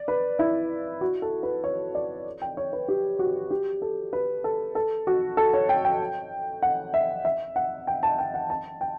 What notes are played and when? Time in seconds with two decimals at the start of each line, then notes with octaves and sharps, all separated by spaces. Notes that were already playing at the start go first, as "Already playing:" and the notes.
Already playing: D5
0.08 B4
0.39 E4
1.01 F#4
1.22 A4
1.43 B4
1.64 C#5
1.95 D5
2.42 G5
2.57 C#5
2.73 B4
2.88 G4
3.19 F#4
3.51 G4
3.82 A4
4.13 B4
4.44 A4
4.75 A4
5.07 F#4
5.37 A4
5.54 C#5
5.69 G5
5.85 G5
6.62 F#5
6.94 E5
7.25 E5
7.56 F#5
7.87 G5
8.03 A5
8.19 G5
8.34 F#5
8.50 A5
8.81 G5